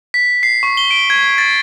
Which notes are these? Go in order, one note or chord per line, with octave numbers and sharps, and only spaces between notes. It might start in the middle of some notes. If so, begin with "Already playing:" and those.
B6
C7
C#6
G7
D7
G#6
A6